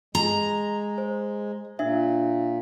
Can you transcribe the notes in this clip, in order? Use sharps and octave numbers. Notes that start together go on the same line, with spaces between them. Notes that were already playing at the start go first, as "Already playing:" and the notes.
G#3 A#5
C5
A#2 D4 E5